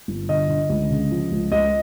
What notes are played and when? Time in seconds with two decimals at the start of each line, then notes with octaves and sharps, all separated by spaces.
0.08 G1
0.29 D3 D#5
0.49 D3
0.69 C#2
0.90 C#3
1.11 F3
1.31 C#2
1.52 C#2 D#5